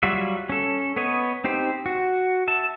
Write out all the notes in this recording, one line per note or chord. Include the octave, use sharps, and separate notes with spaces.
F#3 G3 F4 F#4 E5
C#4 A4
B3 B4 C#5 D#5
C4 D#4 G4 C5
F#4
E5 A5